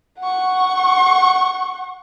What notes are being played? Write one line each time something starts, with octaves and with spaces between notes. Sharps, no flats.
F#5 C#6